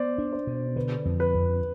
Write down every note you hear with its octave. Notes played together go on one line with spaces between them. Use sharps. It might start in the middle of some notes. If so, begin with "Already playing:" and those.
Already playing: B3 C5 D5
D4
C5
B2
D3 B4
F2
B4
F2